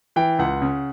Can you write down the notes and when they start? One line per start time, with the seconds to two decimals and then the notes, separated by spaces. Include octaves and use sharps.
0.16 E3 G5
0.39 C#2 F#5
0.62 C#3